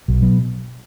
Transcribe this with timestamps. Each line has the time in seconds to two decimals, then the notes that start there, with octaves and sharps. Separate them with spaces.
0.08 B1
0.22 B2 F#3 B3